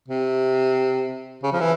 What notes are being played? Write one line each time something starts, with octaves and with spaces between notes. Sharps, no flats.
C3
C#3
F3
E3